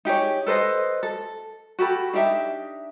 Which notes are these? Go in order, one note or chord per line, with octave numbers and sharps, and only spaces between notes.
D#4 G4 G#4 C#5
A4 B4 C5 D#5
A4
F#4 G4 A4 B5
D4 D#4 G4 E5